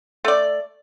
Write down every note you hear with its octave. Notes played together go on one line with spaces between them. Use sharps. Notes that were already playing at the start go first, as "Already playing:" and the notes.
A3 D5